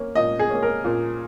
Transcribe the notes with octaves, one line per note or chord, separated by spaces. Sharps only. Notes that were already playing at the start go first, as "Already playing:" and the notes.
Already playing: A#3 C#4
A#2 D#5
G#4
A#3 C#4
A#4
A#2